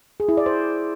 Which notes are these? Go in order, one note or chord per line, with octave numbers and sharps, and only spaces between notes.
G#4
E4
D5
C5